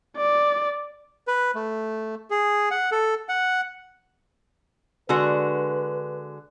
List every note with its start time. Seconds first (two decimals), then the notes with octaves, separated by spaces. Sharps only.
0.17 D5
1.27 B4
1.55 A3
2.30 G#4
2.71 F#5
2.92 A4
3.29 F#5
5.09 D3 G#3 F#4 B4